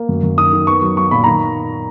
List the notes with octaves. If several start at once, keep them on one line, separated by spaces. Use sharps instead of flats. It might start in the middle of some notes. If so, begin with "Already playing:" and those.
Already playing: A#3
F#2
F#2
D#3 D#6
D#3
B3 C#6
F#3
F#3 C#6
A#2 B5
D#3 A#5